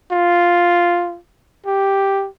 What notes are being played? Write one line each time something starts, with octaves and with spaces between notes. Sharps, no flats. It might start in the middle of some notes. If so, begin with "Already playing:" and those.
F4
G4